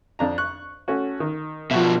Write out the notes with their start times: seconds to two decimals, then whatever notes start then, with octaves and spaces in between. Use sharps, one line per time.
0.19 F2 D4 A#5
0.38 C#6 F#6
0.88 A3 C#4 F#4
1.20 D#3
1.71 B2 F3 F#4 E5